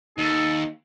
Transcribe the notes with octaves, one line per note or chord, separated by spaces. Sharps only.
D#2 D#4 A4